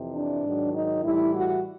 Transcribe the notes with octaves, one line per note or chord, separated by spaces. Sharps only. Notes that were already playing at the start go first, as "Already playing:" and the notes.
Already playing: F2 C3 E3
D4
G#2 D#3 F#3
D#4
A2 E3 G3 E4
F#4